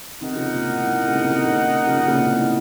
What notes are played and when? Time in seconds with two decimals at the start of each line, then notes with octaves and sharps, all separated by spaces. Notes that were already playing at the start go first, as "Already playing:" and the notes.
0.21 C3 D#3 D#4 A#4 D#5 F#5
0.36 C#3 F3
0.52 A#2
0.68 A2
0.84 A2
0.98 A#2
1.08 C#3
1.14 A2 C3
1.24 C#3
1.29 C3 D#3
1.45 A#2 C#3
1.87 C#3 F3
2.07 A#2 C#3
2.23 A2 C3
2.38 A2